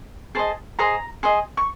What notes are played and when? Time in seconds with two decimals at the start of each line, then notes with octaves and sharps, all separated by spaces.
0.35 G#4 C5 D#5 A5
0.79 G#4 C5 D#5 A#5
1.23 G#4 C5 D#5
1.57 C#6